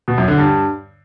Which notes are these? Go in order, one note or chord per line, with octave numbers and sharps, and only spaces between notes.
B2
F#2
D3
G2